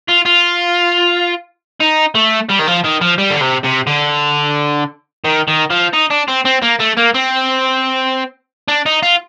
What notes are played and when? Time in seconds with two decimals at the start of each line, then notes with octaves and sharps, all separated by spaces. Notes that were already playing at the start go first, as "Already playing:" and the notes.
0.09 F4
0.26 F4
1.81 D#4
2.15 A3
2.49 G3
2.59 D#3
2.67 F3
2.84 D#3
3.01 F3
3.18 G3
3.30 D3
3.41 C3
3.64 C3
3.87 D3
5.24 D#3
5.48 D#3
5.71 F3
5.93 D#4
6.11 D4
6.28 C4
6.45 C4
6.62 A#3
6.79 A3
6.97 A#3
7.14 C4
8.68 D4
8.86 D#4
9.03 F4